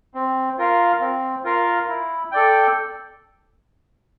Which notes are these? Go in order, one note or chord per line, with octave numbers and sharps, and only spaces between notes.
C4
F4 A#4 F5
C4
F4 A#4 F5
E4
A4 D5 G5